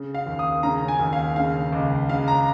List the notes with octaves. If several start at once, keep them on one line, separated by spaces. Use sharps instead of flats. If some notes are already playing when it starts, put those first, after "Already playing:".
Already playing: C#3
F5
D#2
D#6
C#3 A#5
G#5
D#2
F5
C#3 F5
C#2
C#3 F5
A#5